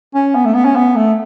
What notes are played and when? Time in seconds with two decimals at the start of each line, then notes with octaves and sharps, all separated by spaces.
0.14 C#4
0.35 B3
0.45 A3
0.54 B3
0.65 C#4
0.75 B3
0.96 A3